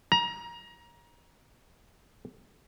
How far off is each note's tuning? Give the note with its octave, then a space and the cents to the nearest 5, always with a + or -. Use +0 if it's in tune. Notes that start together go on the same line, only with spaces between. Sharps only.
A#5 +25